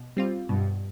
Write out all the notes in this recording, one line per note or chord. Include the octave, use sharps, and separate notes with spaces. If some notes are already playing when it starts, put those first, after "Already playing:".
Already playing: B2
G3 C4 F4
G2 B2